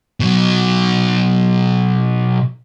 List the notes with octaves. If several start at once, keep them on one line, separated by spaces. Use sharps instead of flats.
B2 F#3